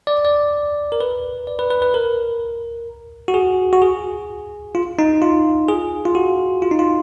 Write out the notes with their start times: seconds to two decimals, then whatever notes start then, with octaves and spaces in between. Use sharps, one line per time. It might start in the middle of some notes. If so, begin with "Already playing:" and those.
0.07 D5
0.25 D5
0.92 A#4
1.01 B4
1.47 D5
1.59 B4
1.70 B4
1.82 B4
1.94 A#4
3.28 F#4
3.34 G#4
3.73 F#4
3.82 G#4
4.75 F4
4.99 D#4
5.22 F4
5.69 G#4
6.05 F4
6.15 F#4
6.62 F4
6.71 D#4
6.79 F4